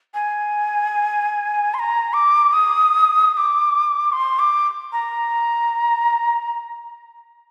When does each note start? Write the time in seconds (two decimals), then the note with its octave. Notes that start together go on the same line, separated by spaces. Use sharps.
0.14 G#5
1.74 C6
1.79 A#5
2.13 D6
2.53 D#6
3.33 D#6
3.37 D6
4.12 C6
4.39 D6
4.93 A#5